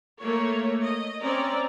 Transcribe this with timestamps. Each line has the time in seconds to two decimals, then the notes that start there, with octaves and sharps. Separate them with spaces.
0.19 A3 A#3 C#5
0.83 D#5
1.22 C4 C#4 D5 A#5